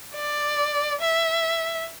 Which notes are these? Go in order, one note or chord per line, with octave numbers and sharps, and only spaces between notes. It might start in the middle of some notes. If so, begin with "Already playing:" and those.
D5
E5